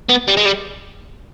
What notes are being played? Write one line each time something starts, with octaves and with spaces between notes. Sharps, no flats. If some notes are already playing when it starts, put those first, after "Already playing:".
B3
G3
G#3
G3